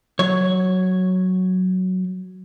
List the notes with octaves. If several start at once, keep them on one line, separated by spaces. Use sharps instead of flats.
F#3 C#5